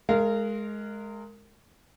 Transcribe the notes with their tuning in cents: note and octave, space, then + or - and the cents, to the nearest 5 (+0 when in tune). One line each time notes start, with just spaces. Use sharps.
G#3 +15 A#4 -20 F5 -25